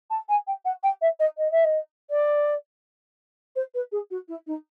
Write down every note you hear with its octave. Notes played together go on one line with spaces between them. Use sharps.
A5
G#5
G5
F#5
G5
E5
D#5
D#5
E5
D#5
D5
C5
B4
G#4
F#4
E4
D#4